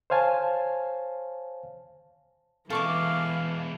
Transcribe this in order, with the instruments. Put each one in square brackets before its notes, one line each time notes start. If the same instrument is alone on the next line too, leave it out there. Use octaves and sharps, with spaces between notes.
[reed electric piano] C5 C#5 F5 G#5 A5
[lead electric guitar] B2 G#3 [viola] E3 [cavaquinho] A4 C#6 D6 [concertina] F5